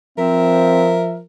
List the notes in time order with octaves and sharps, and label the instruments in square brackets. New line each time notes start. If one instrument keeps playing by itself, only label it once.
[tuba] F3 [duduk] C4 [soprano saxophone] A#4 [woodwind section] E5